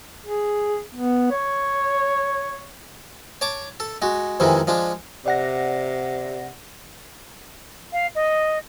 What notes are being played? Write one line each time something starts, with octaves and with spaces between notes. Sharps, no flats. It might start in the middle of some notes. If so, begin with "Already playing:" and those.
G#4
B3
C#5
C#5 A5 D6
A4
G#3 F#4
F2 C3 D#3 E3 G#3
F3 G#3 D4
C3 D5 F#5 A#6
F5
D#5